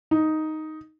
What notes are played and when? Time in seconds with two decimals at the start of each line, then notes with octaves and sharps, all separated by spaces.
0.11 D#4